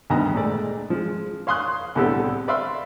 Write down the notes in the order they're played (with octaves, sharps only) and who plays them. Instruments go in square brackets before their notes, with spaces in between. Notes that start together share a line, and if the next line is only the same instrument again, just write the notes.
[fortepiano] D2 G2 D#3 B3 D#5 A#5
A#2 G#3 A3 D5
F3 G#3
C#5 F5 C6 D#6 F#6
C2 A2 D3 B3 G4 A4
B4 D5 E5 F5 C6